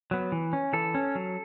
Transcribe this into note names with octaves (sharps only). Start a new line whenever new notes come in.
F#3 B3
E3
C#4
E3 A4
C#4
F#3